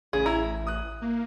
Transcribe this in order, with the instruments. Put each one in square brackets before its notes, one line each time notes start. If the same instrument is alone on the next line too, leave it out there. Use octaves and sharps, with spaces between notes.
[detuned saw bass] A1 [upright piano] C#3 [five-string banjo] G#4
[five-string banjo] E4 [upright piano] A#5
[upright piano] D#6 F#6
[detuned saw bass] A#3